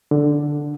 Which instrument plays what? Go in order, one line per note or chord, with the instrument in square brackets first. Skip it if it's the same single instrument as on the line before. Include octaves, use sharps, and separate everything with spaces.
[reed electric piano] D3